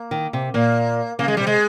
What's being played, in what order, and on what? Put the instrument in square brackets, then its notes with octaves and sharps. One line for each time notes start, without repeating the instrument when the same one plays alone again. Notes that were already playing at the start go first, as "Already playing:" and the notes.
Already playing: [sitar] A#3
[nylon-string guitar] D#3
C3
[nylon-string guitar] A#2 [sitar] A#3
[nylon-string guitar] C#3 [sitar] A#3
[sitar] G#3
[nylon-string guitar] C3 [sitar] G3
[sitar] G#3